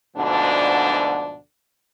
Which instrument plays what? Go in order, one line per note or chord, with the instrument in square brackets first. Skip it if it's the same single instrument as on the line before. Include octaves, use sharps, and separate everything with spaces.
[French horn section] D2 G#2 B2 D3 F3 D4